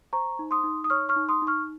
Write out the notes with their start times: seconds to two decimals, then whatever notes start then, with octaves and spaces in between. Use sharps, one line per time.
0.13 C5 A#5 C#6
0.39 D#4
0.51 C6 D#6
0.64 D#4
0.84 D#6
0.90 C#5 C#6 F6
1.09 C#6 F6
1.16 D#4
1.29 C6 D#6
1.42 D#4
1.47 C#6 F6